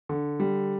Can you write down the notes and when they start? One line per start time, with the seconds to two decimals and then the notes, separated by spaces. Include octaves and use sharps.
0.09 D3
0.40 G3